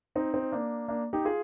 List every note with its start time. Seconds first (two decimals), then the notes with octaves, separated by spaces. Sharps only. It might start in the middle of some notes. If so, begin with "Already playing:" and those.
0.15 C4 D#4
0.34 C4 D#4
0.52 A#3 D4
0.88 A#3 D4
1.13 D#4 G4
1.25 F4 G#4